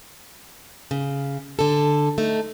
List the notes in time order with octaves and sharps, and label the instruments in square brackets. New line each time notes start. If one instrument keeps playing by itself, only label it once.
[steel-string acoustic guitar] C#3
D3 A4
A3 D#4